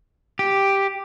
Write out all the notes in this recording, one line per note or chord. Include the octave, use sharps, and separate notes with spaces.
G4